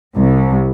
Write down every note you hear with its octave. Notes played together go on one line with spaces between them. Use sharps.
C2